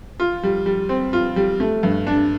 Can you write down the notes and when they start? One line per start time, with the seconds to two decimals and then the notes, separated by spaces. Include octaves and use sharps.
0.20 F4
0.43 G3
0.66 G3
0.89 C4
1.13 F4
1.36 G3
1.60 A3
1.83 G2
2.07 D4